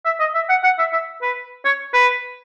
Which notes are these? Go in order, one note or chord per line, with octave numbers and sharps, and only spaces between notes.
E5
D#5
E5
F#5
F#5
E5
E5
B4
C#5
B4